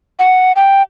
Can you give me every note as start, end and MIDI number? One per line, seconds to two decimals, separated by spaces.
0.19 0.52 78
0.56 0.82 79